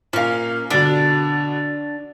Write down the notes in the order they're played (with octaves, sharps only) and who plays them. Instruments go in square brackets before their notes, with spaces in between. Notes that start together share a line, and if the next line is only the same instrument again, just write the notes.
[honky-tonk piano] A#2 F5 [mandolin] C#4 A#4
[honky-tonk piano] B2 D3 [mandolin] D4